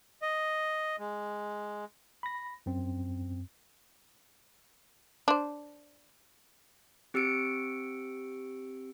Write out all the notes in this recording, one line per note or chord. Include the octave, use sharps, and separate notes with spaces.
D#5
G#3
B5 A#6
F#2 C4
D4 C5
C4 G4 E6 C#7 D7